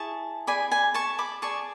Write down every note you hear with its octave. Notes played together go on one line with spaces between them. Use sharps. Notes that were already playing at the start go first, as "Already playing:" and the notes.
Already playing: E4 G#4 A5 C#6
G#4 D5 G#5 B5
G#5 B5
A5 C#6
B5 D6
G#4 D5 A5 C#6